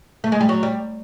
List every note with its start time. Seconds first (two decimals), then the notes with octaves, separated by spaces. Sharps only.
0.24 A3
0.32 G#3
0.41 G3
0.49 F#3
0.63 G3